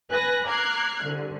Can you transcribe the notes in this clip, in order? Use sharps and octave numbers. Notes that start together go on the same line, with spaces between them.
B4 G#5 F#6 A#6
A#5 D6 F6 F#6 G#6 C7
C2 D3